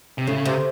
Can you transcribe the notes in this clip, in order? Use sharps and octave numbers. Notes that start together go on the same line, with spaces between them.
C3
A2 C#3
C3